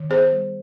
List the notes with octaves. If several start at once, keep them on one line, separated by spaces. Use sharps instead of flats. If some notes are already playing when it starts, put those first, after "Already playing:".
Already playing: D#3
B3 G#4 C5
G3